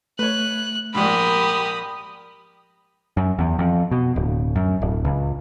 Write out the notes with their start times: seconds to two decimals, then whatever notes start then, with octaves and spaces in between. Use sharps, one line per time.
0.19 A3 B4 C#5 F#6
0.95 A#1 G#2 G4 A#4 B5 D#6
3.17 F#2
3.39 E2
3.59 F2
3.91 B2
4.16 D1
4.56 F#2
4.82 D1
5.05 C#2